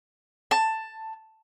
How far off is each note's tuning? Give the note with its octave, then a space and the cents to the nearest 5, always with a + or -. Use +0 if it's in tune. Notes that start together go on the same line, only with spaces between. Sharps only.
A5 +10